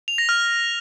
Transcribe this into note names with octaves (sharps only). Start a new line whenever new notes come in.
F7
A#6
F6